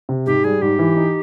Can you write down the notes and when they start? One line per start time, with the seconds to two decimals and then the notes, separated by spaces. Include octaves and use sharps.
0.09 C3
0.26 G#2 G4
0.44 G3 G#4
0.62 G#2 G4
0.79 E3
0.97 D#4